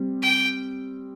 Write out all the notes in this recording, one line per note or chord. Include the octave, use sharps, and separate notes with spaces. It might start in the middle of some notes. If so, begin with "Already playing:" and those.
Already playing: G3 C4
G5